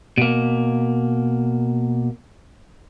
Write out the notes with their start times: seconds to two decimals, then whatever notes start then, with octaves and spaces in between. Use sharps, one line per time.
0.18 B2 A#3